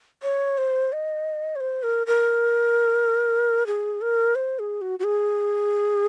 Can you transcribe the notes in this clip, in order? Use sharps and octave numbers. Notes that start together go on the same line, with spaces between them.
C#5
C5
D#5
C#5
C5
A#4
A#4
G#4
A#4
C5
G#4
F#4
F#4
G#4